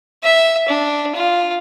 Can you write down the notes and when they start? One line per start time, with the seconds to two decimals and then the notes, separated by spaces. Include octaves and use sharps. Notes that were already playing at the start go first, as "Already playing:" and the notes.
0.23 E5
0.68 D4
1.15 F4